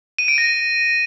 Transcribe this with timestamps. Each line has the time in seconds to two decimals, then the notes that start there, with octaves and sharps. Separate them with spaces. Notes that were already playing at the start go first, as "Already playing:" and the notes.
0.19 D#7
0.28 D7
0.38 A#6